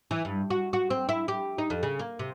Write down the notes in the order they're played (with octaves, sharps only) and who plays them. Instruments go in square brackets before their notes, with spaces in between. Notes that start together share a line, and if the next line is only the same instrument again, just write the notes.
[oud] E3
G2
F#4
F#4
C4
E4
G4
D#4
F2
C#3
A#3
C3